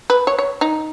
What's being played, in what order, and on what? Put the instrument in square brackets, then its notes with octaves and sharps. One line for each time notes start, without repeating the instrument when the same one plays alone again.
[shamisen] B4
C#5
C#5
D#4